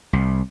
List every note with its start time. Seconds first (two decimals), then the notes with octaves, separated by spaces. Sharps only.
0.13 C2